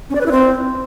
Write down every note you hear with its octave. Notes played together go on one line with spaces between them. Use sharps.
C#4
D5
B4
E4
C4